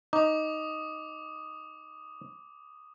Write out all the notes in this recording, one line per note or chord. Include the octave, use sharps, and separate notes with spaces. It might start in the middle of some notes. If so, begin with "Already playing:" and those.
D#4 D6 D#6